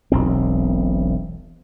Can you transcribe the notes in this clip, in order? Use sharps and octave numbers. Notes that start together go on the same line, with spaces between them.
E1 B1 C4